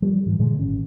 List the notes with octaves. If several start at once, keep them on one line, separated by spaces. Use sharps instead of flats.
F3 G3
G#2 E3
A#2 D3 F3 G#3
G#1 C#4